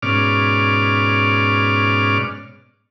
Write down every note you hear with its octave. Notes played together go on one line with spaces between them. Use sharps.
G#2 B2 C#4 D5 D6 F6